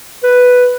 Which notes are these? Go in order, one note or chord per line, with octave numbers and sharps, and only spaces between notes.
B4